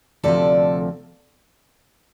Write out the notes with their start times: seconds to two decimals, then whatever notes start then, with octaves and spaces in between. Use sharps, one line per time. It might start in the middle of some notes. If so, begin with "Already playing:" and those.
0.23 D2 C3 F3 A4 D5